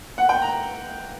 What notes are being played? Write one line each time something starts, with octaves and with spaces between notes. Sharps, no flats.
F#5
G5
A#5